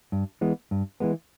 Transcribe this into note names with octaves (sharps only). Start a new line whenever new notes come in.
G2
E3 G#3 B3
G2
E3 G#3 B3